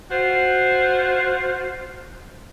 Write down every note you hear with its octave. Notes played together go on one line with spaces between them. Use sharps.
F4 F#4 C5